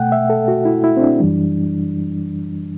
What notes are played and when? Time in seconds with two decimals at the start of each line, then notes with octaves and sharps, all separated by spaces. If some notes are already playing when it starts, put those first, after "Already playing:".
Already playing: B2 A3 F#5 G5
0.12 E5
0.30 A4
0.48 F#4
0.65 E4
0.84 E4
0.97 C4
1.02 D4
1.20 F#2 E3 G3